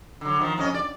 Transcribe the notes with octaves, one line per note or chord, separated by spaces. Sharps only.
D3 F#3
D#3 F3
F2 C#4 D#5
D5